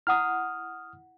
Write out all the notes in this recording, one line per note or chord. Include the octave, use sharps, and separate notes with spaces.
E4 F#5 D#6 F6